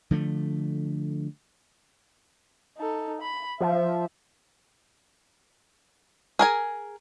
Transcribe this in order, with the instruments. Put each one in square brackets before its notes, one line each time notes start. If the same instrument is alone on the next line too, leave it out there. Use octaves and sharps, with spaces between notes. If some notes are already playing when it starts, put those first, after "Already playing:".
[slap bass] D3 F3 A3
[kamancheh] D#4 A4
B5
[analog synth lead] F3 [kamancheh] E5
[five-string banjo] G#4 A#4 G#5